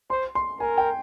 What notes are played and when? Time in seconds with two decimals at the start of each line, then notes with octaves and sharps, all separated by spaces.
0.10 C5 C6
0.35 C6
0.60 A#4 G#5
0.78 G5